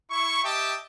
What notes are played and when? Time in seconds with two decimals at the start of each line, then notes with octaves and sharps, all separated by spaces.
0.10 E4 C#6
0.43 G4 D#5 E5 G5 A5